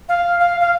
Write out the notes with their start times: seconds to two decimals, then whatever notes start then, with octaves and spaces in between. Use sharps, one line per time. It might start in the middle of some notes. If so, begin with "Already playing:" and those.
0.09 F5
0.40 F5
0.61 F5